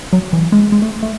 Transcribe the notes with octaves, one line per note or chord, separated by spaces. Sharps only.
F#3
E3
G#3
G#3
A3
A3